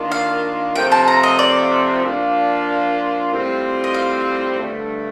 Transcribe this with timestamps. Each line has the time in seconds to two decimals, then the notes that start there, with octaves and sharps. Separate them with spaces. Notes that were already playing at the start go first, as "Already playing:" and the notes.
Already playing: D#3 A#3 D4 F4
0.12 F5
0.75 C3 F3 A3 C4 F4 G5
0.92 A5
1.08 A#5
1.23 D#5
1.39 D5
2.03 F3 A#3 D4 F4
3.31 A2 G3 C4 F4
3.84 D#5
3.94 F5
4.59 G2 D3 A3